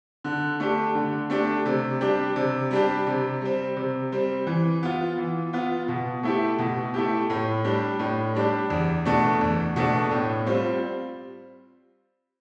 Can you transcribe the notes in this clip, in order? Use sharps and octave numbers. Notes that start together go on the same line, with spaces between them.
D3
A3 D4 G4
D3
A3 D4 G4
C3
G3 D4 G4
C3
G3 D4 G4
C3
G3 C4
C3
G3 C4
E3
B3 F4
E3
B3 F4
B2
A3 E4 G4
B2
A3 E4 G4
A2
G3 D4 G4
A2
G3 D4 G4
E2
B2 A3 D4
E2
B2 A3 D4
A2
G3 C4 F4